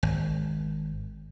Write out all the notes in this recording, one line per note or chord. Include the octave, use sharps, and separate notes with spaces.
G#1